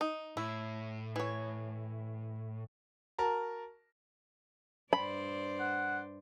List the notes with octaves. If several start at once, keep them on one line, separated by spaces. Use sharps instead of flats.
D#4
A2 E4
E3 C#5
F#4 A#4 A5 A#5
G2 C5 D5 B5
F#5